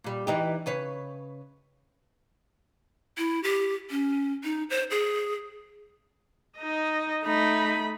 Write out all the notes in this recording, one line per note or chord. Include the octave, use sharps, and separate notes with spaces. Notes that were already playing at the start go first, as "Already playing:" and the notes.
A#2 G3
E3 D#4 G4
C#3 B4 C#5
E4
G4
C#4
D#4
C5
G#4
D#4 D#5
A3 D#4 B5